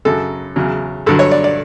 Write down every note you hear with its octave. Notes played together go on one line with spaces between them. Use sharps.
F#2 C#3 F#3 A4
E2 C#3 F#3
G2 D3 F#3 A4
C#5
D5
D5